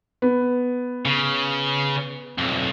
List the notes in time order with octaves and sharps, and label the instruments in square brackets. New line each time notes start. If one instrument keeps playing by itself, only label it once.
[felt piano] B3
[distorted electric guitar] C#3
B1 F2